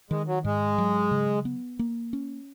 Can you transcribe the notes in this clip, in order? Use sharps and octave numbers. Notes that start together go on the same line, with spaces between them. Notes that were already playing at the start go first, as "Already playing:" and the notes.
D#3 G#3
F#3
G#2 G#3
F#3
C#3
B3
A#3
C#4